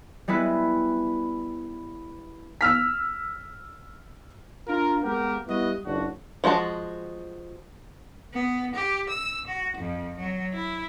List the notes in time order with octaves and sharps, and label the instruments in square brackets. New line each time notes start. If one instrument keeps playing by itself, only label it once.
[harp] G3 G#3 B3 E4 B4
[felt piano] E6 F6 B6
[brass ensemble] D4 F4 A#4
G#3 A#3 B3 G4 A#4
G3 B3 E4 F#4 D#5
F#1 C#2 D4 F#4
[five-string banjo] F3 G#3 F#4 A5
[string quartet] B3
G4
E6
F#4
F2
F#3
E4